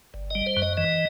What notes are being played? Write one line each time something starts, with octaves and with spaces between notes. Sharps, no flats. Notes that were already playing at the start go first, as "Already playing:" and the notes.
G1
G3 D#5
C5
F#2
D#5
E3 D#5